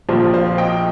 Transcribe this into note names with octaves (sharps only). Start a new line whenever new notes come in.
A#1 A#2 F3 G4 C5
C5 F5
D#5 G5